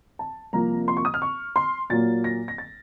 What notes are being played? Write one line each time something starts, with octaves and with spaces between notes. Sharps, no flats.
A5
C2 C3 F3 A#3 A#5
C6
C#6
D#6
F6
C#6
C6
A#2 F#3 A#3 A6
A#6
A#6
A6